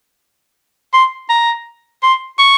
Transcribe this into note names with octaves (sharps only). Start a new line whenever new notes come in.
C6
A#5
C6
C#6